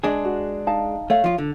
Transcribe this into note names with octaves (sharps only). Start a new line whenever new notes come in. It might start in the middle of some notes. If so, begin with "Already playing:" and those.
G#3 D4 G#4
F#4
D#4 F5 A5
A3 C#5 F5
F3 F4
D3